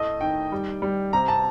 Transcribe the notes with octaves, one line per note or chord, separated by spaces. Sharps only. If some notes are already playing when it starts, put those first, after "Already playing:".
Already playing: A2 A3 D#5
D#3 G5
G3
G3
C3 A#5
A5